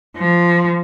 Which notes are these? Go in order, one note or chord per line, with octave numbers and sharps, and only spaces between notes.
F3